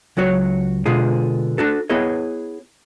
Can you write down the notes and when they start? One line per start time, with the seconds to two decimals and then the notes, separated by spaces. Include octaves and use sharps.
0.17 C#2 F#3 F#4 C#5
0.86 B2 D3 G#3 F4 G#4
1.58 D4 F#4 A4
1.90 B3 E4 G#4 C#5 D#5